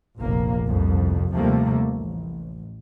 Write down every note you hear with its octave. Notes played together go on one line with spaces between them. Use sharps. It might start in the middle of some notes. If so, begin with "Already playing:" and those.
F1 A#1 A#3
G1 C2 F2
D#2 C3 F3 G3 A3 A#3
A1